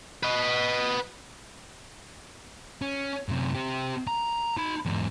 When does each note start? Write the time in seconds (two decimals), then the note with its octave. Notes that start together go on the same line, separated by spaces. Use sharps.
0.23 B4 D#5
2.82 C#4
3.29 F#2 C3
3.55 C4 G4
4.07 A#5
4.57 D#4 B5
4.86 E2 G#2